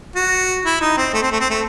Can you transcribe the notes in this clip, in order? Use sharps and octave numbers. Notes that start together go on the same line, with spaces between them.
F#4
E4
D#4
C4
A3
C4
A3
C4
A3